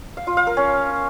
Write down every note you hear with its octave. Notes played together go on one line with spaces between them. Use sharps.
F5
F4
F5
A#4
C#4